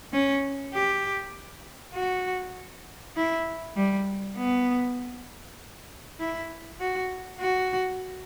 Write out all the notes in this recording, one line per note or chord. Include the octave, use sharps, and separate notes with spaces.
C#4
G4
F#4
E4
G3
B3
E4
F#4
F#4